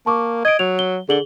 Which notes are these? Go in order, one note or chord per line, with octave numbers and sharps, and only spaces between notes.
A#3 A5 C#6 D6
D#5 G#6 D7
F#3 F7
G7
D3 G#4 F#7 G7